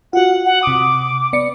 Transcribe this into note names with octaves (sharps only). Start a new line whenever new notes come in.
F4 F#4 F#5
F#5
C3 D6 D#6
B3 D5 C#7